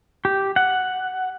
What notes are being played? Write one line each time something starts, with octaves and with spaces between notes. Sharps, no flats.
G4
F#5